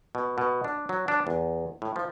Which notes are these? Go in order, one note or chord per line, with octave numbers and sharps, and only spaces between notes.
B2
B2
D4
F#3
D4
E2
A2
F3